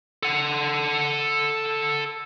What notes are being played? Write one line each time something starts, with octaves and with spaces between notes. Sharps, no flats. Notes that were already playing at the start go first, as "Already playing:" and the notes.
A4 F#5